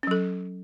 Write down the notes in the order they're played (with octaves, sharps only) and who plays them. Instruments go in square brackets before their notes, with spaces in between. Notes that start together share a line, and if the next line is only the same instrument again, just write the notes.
[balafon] C#4
F#3
A4